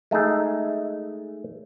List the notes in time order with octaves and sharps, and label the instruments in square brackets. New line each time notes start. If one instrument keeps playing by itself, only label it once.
[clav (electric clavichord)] G#3 A3 D#4 G#4